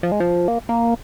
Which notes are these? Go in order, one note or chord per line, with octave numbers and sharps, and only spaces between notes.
F3
G#3
F3
A#3
A#3